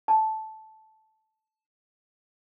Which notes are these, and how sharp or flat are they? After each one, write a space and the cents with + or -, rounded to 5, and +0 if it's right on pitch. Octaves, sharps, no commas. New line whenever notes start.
A5 -10